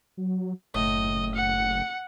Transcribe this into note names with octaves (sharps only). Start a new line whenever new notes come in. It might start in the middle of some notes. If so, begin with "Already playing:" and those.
F#3
F#1 A2 D#5
F#5 C#7